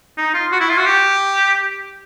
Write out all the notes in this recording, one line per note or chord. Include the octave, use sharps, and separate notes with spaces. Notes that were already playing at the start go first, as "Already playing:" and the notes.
D#4
F4
F#4
E4
F4
F#4
G4